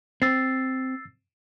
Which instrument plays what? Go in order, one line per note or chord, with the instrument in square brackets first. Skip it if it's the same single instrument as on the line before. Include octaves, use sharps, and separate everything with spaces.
[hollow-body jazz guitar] C4 [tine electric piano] E6 A6 C7